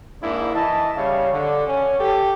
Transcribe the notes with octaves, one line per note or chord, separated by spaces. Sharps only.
G#2 A#3 D4 E4
E3 D#5 E5 A5
C#3 G3 C#5 F5
D3
C#4
G4 A4